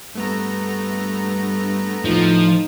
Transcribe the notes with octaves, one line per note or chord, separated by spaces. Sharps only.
G2 A3 B3 A#5
A2 F3 D#4